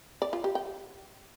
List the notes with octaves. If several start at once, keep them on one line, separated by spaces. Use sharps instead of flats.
D5
F4
G4
G5